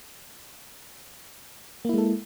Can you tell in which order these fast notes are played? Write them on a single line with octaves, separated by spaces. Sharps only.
A#3 E4 G#3 A4